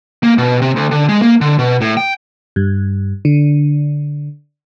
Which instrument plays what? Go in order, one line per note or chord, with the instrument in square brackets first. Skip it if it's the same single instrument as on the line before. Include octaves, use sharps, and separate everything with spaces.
[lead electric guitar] A#3
B2
C3
D2
D3
G#3
A#3
D3
B2
A2
G5
[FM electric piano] G2
D3